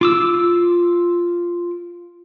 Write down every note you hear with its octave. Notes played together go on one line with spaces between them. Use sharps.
F4 D6 E6